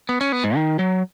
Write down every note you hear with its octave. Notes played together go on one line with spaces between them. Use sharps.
B3
C#4
B3
G#2
D#3
F#3